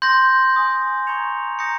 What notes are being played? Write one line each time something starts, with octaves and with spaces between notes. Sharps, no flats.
C6 G6 A#6
G#5 C6 D#6 G6
A#5 C#6 G#6 C#7 F7
A#5 D#6 G6 A#6 C#7